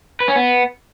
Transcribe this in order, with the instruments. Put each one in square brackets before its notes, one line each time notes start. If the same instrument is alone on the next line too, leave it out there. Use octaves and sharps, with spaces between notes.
[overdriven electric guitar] B4
C#4
B3